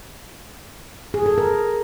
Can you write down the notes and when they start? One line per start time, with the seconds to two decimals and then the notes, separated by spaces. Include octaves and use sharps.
1.14 G#4
1.26 A4
1.38 A#4